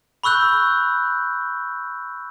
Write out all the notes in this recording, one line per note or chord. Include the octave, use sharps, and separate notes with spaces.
B5 C#6 E6 F#6 G6